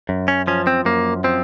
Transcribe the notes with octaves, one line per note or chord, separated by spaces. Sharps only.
F#2
C#4
F3 C#4
C4
F#2 A#3
F3 C4